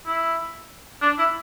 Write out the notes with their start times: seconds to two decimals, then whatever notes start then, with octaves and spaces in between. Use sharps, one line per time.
0.06 E4
1.02 D4
1.19 E4